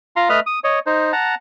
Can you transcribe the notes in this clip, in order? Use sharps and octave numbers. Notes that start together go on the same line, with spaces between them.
F4 F5 A#5 C6
A3 B4 D#5 F6
D#6
C#5 D#5
D#4 C5
F#5 A5 A#5